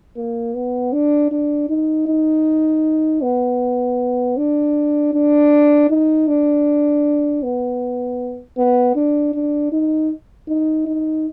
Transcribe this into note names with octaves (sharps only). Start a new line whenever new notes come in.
A#3
B3
D4
D4
D#4
D#4
B3
D4
D4
D#4
D4
B3
B3
D4
D4
D#4
D#4
D#4